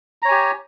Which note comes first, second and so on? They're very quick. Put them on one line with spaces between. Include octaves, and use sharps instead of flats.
A#5 C#5 G#5 G4